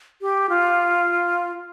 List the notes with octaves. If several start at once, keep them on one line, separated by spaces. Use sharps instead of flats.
G4
F4